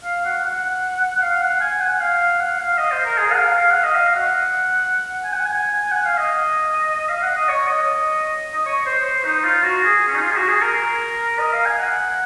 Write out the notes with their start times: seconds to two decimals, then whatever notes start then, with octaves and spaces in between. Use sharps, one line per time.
0.04 F5
0.25 F#5
0.44 F#5
1.21 F5
1.41 F#5
1.61 G#5
1.81 F#5
2.00 F5
2.40 F#5
2.59 F5
2.78 D#5
2.91 C5
3.05 A#4
3.17 G#4
3.32 F#5
3.37 F5
3.57 F5
3.70 F#5
3.83 D#5
3.95 F5
4.15 F#5
5.24 G#5
5.34 F#5
5.45 G#5
5.92 F#5
6.05 F5
6.18 D#5
7.09 F5
7.22 F#5
7.36 D#5
7.48 C#5
7.67 D#5
8.54 D#5
8.66 C#5
8.86 C5
9.05 C5
9.24 D#4
9.44 F4
9.63 F#4
9.84 G#4
10.08 C#4
10.15 D#4
10.22 F4
10.31 G#4
10.36 F#4
10.48 G#4
10.62 A#4
11.39 D#5
11.53 F5
11.65 G#5
11.79 F#5